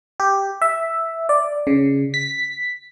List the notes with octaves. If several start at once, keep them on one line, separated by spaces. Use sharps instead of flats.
G4
E5
D5
C#3
B6